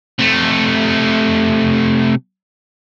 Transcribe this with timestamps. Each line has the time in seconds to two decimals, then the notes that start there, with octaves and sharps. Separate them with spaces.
0.19 C3 A3